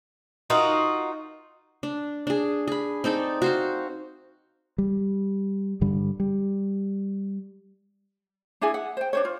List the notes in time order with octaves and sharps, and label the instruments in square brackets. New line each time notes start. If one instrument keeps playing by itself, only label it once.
[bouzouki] D#4 F4 F#4 A#4
[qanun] D4
D4 G#4
G#4 B5
C4 D#4 A4 D5
F#4 C5 F5
[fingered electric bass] G3
G2 D3 G3
G3
[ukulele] D4 E4 G#4 G#5
F#5
C5 G5
D4 C5 C#5
F4